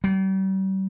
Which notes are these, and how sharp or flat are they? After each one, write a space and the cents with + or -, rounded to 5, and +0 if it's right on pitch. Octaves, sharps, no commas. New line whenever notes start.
G3 -40